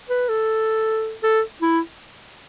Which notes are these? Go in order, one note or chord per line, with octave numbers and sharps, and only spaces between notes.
B4
A4
A4
E4